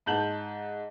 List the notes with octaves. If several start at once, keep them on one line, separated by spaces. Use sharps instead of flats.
G#2 A5 G6 F#7